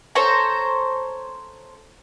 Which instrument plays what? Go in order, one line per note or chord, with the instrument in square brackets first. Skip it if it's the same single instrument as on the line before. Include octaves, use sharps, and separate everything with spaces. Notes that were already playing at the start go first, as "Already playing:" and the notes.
[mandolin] A4 C5 C#5 A#5